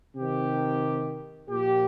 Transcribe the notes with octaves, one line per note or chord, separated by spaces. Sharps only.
C3 D#3 G4
A#2 F3 G4